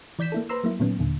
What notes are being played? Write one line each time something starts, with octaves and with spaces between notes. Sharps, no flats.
E3 D5 G6 B6 E7
A#3 E4 A4
B4 C5 A#5 C6 E6
F#3 A#3 E4
A#2 D#3 F#3 B3 C#4
D#2 A#2 D3